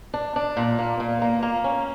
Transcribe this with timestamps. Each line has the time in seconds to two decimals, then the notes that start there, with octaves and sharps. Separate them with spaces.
0.14 D4
0.36 D4
0.57 A#2
0.79 A#3
1.00 A#2
1.22 A#3
1.43 A#3
1.64 C#4